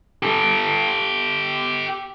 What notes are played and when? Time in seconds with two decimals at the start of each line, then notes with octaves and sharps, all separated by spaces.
0.23 G4 A4